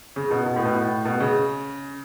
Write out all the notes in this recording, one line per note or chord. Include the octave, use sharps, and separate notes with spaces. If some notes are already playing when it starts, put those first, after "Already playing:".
C#3
B2
B2
A2
B2
A2
B2
C#3